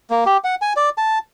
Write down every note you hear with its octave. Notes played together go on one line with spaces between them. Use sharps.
A#3
G4
F#5
G#5
D5
A5